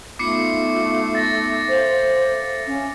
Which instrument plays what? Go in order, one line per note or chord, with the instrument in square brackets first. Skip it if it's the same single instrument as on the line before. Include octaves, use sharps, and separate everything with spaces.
[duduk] A3 [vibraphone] B3 D#4 [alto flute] F4 [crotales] D6 C7 C#7
[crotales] A6 A#6
[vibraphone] A4 E5 F5 [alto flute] C5
[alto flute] C#4